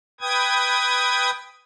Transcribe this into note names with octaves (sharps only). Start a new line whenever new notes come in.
B4 G5 D#6 G#6